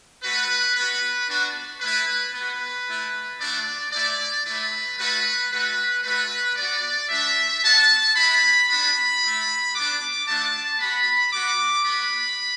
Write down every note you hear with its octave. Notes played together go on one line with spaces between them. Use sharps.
A3 F#4 B4
B3 F#4 B4
B3 D4 F#4
A3 E4 B4
B3 F#4 B4
A3 E4
A3 D4 F#4 D5
A3 E4 D5
A3 E4 B4
A3 F#4 B4
A3 F#4 B4
A3 F#4 B4
B3 F#4 D5
A3 D4 F#4 E5
B3 D4 F#4 A5
B3 E4 B5
B3 D4 F#4 B5
A3 E4
B3 D4 F#4 D6
A3 D4 F#4 A5
B3 F#4 B5
B3 F#4 D6
B3 F#4 B5